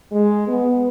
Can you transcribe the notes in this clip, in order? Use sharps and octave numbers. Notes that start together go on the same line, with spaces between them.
G#3
B3